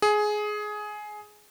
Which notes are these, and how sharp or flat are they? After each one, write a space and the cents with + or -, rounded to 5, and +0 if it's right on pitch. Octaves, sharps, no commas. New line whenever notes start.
G#4 +15